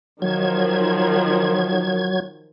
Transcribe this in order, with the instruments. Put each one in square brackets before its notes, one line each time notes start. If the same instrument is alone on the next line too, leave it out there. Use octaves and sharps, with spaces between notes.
[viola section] D#3 F3 [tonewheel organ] F#3 G#6